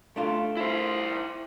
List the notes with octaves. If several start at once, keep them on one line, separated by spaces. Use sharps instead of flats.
A3 D4 F4
E4 C5